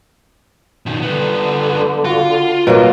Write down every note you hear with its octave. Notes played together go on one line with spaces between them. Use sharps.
B2 D#3
D3 G3 B3
F4 F#4
B2 F#3 A#3